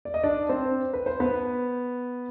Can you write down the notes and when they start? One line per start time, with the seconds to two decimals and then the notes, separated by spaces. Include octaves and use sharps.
0.05 D5
0.14 D#5
0.23 D4 D5
0.49 C4 C5
0.93 B4
1.06 C5
1.20 B3 B4